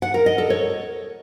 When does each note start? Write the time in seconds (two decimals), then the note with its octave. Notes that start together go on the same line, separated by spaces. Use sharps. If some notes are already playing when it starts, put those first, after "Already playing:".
0.02 F#5
0.14 A#4
0.26 D#5
0.38 A4
0.50 C#5